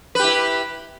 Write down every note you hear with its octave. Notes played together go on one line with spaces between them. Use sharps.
E4 G4 B4